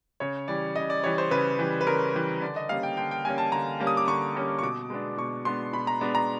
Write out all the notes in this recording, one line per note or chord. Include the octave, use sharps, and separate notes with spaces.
C#3 C#5
E3 G3 D5
C#3 D#5
D5
E3 G3 C#5
C5
C#3 B4
E3 G3
B4
C#3 A#4
E3 G3
D3 D5
D#5
G3 A#3 C#4 F5
G5
D3 G5
G5
G3 A#3 C#4 G#5
A5
D3 A#5
G3 A#3 C#4
D#6
D6
D3 C#6
G3 A#3 C#4
C#6
B2 D6
G#3 B3 D4
B2 C#6
G#3 B3 D4 C6
B2 B5
A#5
G#3 B3 D4
A#5